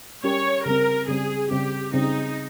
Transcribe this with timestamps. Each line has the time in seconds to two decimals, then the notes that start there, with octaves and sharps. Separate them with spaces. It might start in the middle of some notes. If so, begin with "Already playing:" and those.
0.24 G3 C#4 G4 A#4 C#5
0.66 C#3 G3 C4 A#4
1.08 C#3 G3 C4 G#4
1.51 C#3 G3 C4 G4
1.94 C#3 G3 C4 D#4